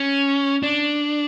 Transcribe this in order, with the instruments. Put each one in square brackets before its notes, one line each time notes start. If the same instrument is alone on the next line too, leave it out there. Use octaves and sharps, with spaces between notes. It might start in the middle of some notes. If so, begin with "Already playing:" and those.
Already playing: [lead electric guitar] C#4
D4